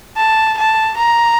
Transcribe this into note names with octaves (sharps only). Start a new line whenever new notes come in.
A5
A5
A#5